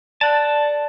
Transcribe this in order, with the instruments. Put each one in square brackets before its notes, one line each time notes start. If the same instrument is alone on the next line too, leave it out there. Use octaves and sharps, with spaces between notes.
[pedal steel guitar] A4 F#5 A5 [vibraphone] D5